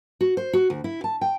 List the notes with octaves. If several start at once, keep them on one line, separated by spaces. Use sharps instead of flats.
F#4
C5
F#4
D2
E4
A5
G5